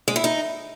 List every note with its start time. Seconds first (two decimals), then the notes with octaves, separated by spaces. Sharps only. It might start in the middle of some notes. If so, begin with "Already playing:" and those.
0.08 G#3
0.16 E4
0.24 D#4